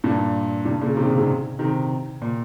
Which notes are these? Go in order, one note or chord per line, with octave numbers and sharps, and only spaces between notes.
G2 A#2
G2 A#2
A#2 C#3
C3 D#3
C#3
G#2 C3
C3 D#3
A#2